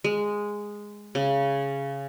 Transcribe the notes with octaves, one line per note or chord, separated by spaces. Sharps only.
G#3
C#3